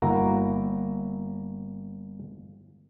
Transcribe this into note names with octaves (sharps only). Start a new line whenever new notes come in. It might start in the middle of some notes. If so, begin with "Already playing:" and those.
G1 A#3 E4 F#4 A#5